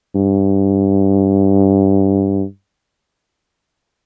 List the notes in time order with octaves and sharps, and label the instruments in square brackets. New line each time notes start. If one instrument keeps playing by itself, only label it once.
[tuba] G2